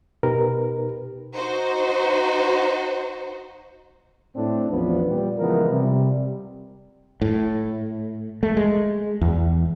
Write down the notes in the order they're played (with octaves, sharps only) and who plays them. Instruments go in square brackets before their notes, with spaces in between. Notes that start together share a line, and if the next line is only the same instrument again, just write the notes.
[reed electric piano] B2 D#4 G4 A#4 B4
[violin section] D#4 F#4 C5
[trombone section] A2 C4 D4
A1 E2 F3 B3 D4 B4
A#2 G3
C#3 E3 F3 G#3 B3 A#4
C3 G3
[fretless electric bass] A2
A3
G#3
E2